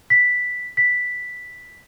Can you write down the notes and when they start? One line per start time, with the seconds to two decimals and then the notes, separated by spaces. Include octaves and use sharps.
0.10 B6
0.77 B6